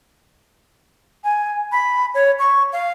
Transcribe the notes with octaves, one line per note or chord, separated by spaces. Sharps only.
G#5
B5
C#5
C#6
F5